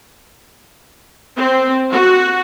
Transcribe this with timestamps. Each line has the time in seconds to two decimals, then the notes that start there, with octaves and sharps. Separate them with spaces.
1.36 C4
1.92 F#4